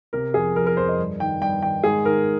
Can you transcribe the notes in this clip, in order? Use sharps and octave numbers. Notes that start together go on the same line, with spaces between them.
C3 A#4
F2 G#4
F2 A#4
A#4
F2 C5
D#5
G2
D#3 G5
G2 G5
D#3 G5
G#2 G#4
D#3 A#4